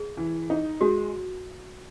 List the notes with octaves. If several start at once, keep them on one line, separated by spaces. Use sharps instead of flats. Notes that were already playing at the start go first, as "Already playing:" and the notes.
Already playing: G#4
E3
D#4
G#3 F#4